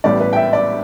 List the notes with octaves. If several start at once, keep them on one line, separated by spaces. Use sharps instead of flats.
A1 A2 G3 B3 D5
B4
G5
E5
D5